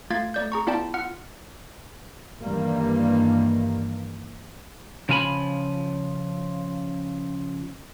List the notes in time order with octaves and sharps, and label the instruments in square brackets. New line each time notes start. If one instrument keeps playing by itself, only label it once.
[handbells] A3 F4 F5 G#6 A6
A3 D5 G6
G#4 A#5 C#6
B3 E4 F4 D5 G5 A5
F4 F#5 F6
[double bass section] G2 D#3 E3 G3 A#3
[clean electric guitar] C#3 F3 F4 G#5 A#5 B5